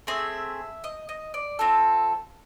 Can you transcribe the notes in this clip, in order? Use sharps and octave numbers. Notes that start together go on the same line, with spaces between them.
A3 C4 G#4 E5
D#5
D#5
D5
C4 F4 A4